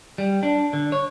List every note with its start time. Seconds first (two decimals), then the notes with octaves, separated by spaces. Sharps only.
0.18 G3
0.43 D4
0.73 D3
0.92 C#5